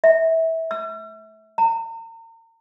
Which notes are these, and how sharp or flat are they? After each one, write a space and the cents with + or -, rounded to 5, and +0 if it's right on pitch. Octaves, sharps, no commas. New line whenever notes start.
E5 -20
E6 +45
A#5 -40